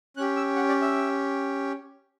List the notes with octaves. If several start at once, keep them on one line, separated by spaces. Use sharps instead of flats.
C#4 G4 F#6
E6
F#5
D5
E5